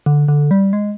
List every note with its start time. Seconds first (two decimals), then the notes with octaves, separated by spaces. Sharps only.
0.06 D3
0.28 D3
0.51 G3
0.73 G#3